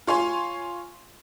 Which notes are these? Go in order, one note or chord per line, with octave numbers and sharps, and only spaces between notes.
F4 C#5 G#5 C6